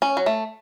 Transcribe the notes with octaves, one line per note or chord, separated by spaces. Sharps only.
C#4
F#3
A3